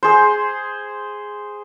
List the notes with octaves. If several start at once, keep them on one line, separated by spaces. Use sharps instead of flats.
G#4 C5